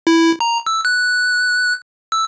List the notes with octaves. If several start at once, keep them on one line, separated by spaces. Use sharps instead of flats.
E4
A#5
E6
F#6
E6